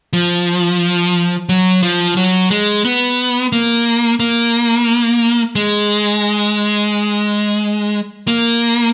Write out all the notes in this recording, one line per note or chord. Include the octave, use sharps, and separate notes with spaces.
F3
F#3
F3
F#3
G#3
B3
A#3
A#3
G#3
A#3